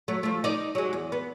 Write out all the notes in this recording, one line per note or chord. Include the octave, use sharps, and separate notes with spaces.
F#3 A3
F3 A3
D#4 D5
F#3 G#3
E2
B3